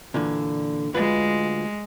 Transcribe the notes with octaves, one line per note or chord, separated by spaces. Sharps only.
A#2 D3 E3
D2 G#3 F4 B4